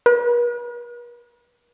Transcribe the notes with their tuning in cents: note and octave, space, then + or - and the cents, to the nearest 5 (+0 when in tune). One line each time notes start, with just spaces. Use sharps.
B4 -45